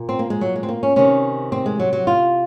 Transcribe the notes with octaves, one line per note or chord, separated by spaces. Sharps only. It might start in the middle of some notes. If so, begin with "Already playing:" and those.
Already playing: A#2
C4
A#3
G#3
F#3
G#3
C4
A#3
C#4
C3 D#3 C#4
C4
G#3
F#3
F#3
F4